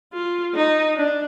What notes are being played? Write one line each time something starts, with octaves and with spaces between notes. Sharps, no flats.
F4
D#4
D4